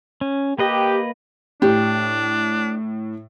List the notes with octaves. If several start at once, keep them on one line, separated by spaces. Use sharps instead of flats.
C#4
A#3 G4 B4 D#5
A2 D4 G4